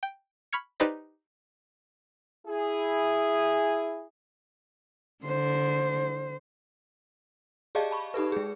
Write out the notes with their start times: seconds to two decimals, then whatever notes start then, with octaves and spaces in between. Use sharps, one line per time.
0.03 G5
0.53 B5 C#6 F6 G#6 C#7
0.80 D#4 G4 B4 C5 D5 D#5
2.47 E4 G#4
5.25 D3 C5
7.75 G4 G#4 D5 D#5 F5 A5
7.91 A5 B5 C#6
8.14 D#4 G4 A4 B4
8.32 G#3 G#4